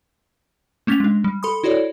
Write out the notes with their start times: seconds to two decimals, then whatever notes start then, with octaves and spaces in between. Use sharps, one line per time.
0.87 A3 A#3 C#4 A6 B6 F7
1.00 G#3 D4
1.24 G3
1.43 A4 B5 C6 D#6
1.64 E4 F#4 A4 C#5 D5